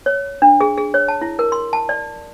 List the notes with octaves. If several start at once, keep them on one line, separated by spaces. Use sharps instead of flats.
C#5
D4
G#4
G#4
C#5
A5
E4
A#4
C6
A5
D5